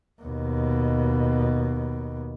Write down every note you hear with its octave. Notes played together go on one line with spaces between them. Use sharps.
D#2 B2